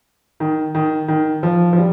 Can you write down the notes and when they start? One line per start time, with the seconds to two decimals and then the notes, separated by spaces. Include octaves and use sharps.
0.40 D#3
0.75 D#3
1.08 D#3
1.43 F3
1.73 F3
1.78 G3